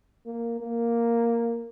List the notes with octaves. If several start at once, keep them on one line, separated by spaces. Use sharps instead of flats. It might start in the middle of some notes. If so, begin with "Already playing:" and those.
A#3
A#3